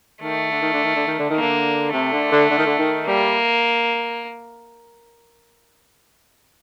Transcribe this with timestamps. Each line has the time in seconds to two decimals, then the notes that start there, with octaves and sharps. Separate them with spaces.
0.22 D#3 A3
0.50 D3
0.61 D#3
0.73 D3
0.84 D#3
0.95 D3
1.07 D#3
1.18 D3
1.29 D#3
1.36 D3 A#3
1.93 C3 A3
2.12 D3
2.31 D3
2.49 D3
2.57 D#3
2.65 D3
2.78 D#3
3.07 G3 A#3